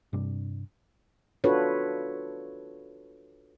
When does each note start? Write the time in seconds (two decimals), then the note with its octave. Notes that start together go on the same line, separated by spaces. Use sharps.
0.13 G2 C3 D4
1.44 D4 F4 F#4 A4 B4 C#5